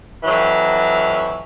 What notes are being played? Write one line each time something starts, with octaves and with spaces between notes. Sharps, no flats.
F2 E3 F#3